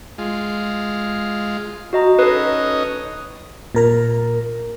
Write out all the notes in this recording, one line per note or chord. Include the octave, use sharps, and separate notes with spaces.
G#3 F4
F#4 D#5 A#5
C#4 D#4 A4 B4 D#5
A#2 A#4 A#5